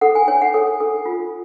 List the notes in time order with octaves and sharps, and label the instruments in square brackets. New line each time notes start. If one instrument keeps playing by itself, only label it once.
[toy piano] A4 F#5
G#5
C#5 G#5
F#5
A4
A4
F4